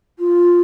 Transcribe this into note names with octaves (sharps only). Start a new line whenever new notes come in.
F4